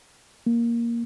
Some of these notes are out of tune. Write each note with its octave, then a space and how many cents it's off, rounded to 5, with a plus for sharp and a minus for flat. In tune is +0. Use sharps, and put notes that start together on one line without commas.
A#3 +5